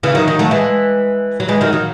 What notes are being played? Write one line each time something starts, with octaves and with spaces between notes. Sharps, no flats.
C#3 E3
D#3 F#3
D#3 F#3
F#3 A3
E3 G#3
F#3
E3 G#3
D#3 F#3
D#3 F#3